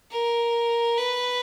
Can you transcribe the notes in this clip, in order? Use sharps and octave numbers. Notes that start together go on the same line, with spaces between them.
A#4
B4